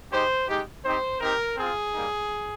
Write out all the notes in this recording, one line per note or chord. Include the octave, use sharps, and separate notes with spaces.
G#3 D#4 G4 C5
G#3 D#4 G4
C4 D#4 G4 C5
C4 D#4 G4 A#4
C4 F4 G#4
G3 A#3 D#4